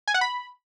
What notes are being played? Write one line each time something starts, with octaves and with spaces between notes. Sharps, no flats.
G#5
F#5
B5